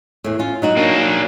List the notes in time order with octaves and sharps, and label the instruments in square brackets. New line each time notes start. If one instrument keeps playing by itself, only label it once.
[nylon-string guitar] E2 A2
C#4 F4
F#3 D#4 F#4
[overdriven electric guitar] A#3 D4